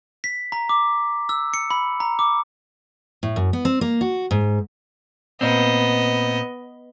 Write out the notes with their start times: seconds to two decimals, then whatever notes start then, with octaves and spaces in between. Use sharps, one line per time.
0.24 B6
0.52 A#5
0.69 D6
1.29 E6
1.54 C#7
1.71 B5
2.00 A#5
2.19 D6
3.23 A2
3.36 F#2
3.53 B3
3.65 C4
3.81 A#3
4.01 F#4
4.31 G#2
5.41 A#2 B3 C4 D#5